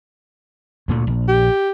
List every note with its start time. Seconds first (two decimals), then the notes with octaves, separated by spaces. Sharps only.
0.88 D2 A#2 A3
1.07 A#1
1.28 G4